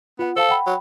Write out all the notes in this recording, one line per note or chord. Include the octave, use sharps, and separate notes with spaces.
B3 F4 F#5
A4 C5 F5 A5
F#5 G5 B5
F#3